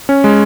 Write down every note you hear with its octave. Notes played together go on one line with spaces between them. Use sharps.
C#4
G#3